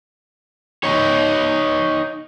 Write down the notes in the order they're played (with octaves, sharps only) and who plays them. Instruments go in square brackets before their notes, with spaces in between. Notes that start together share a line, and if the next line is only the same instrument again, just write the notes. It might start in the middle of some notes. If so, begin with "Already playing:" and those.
[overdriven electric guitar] D#4 C#5